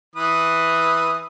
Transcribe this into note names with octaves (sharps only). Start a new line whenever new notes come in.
E3 B4 D#6